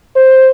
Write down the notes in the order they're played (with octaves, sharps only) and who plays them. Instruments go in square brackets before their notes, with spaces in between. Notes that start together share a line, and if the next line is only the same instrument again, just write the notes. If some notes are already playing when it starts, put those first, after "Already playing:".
[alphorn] C5